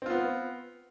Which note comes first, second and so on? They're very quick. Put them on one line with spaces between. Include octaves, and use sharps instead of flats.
C4 F4 B3